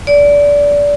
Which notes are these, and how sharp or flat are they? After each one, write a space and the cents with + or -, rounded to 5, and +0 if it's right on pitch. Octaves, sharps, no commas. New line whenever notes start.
D5 -20